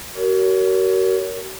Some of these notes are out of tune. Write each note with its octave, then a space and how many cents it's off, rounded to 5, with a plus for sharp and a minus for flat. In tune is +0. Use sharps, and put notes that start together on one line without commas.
F#4 +40 A#4 +0 C#5 +25